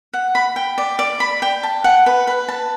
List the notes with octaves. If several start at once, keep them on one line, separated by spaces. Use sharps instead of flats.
F#5
B5
G5
D5
D5
B5
G5
A5
F#5
B4
B4
A5